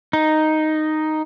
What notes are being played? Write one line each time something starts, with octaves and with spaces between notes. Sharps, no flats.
D#4